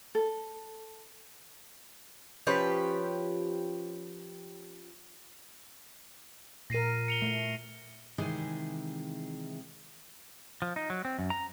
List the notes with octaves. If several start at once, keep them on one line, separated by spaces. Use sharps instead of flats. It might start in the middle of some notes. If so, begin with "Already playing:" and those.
A4
F3 C#4 G4 B4
A#2 A#4 A#6 C7 D#7
C#7 F7 G7
A3
C3 D#3 E3 G#3 D#4 G#4
F3
D#4
F#3
C4
F#2
A#5